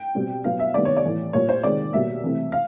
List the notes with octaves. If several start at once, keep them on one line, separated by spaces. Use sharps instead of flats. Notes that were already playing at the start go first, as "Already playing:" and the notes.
Already playing: G5
B2 G3 C4
B2 F#3 B3 F5
E5
C3 D#3 G3 B3 D5
C#5
D5
A2 E3 A3
A#2 G3 A#3 C#5
C5
C3 D#3 G#3 D5
B2 G3 A#3 E5
C3 E3 A3 C4
F5